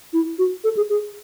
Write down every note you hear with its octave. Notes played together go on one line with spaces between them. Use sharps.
E4
F#4
A4
G#4
G#4